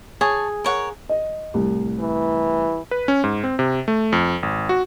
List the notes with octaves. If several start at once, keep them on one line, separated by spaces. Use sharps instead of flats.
G#4 C#5 A5
A#4 C#5 F#5
D#5
C2 A2
E3
B4
C#4
G#2
C4
C3
A3
F2
G#1
F#4